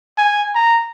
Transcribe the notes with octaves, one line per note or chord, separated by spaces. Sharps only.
G#5
A#5